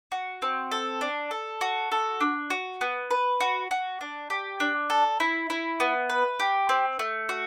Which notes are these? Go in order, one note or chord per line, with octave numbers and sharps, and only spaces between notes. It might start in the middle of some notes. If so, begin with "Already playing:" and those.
F#4
C4
A4
D4
A4
F#4
A4
D4
F#4
B3
B4
F#4
F#4
D4
G4
D4
A4
E4
E4
B3
B4
G4
C4
A3
F#4